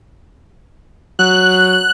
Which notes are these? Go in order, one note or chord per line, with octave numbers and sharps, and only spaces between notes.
F#3 F#6